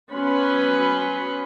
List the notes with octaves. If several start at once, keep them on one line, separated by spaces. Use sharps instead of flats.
F#3 B3 C#4 B4 B5 C6